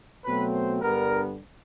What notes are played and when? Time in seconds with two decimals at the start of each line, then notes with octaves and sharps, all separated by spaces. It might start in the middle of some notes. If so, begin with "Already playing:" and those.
0.24 B2 F#3 A3 C4 B4
0.53 C5
0.81 G2 D3 G3 B3 A#4